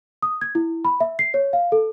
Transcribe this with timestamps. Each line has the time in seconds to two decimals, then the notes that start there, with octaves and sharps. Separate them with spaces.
0.22 D#6
0.41 G#6
0.55 E4
0.85 B5
1.00 E5
1.19 C7
1.34 C#5
1.53 F5
1.72 A4